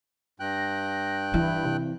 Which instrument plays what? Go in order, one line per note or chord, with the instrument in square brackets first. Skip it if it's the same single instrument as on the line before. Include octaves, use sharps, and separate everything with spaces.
[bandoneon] G2 G5 F#6 [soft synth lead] A#6
[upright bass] E3 [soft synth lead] E4
[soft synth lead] C3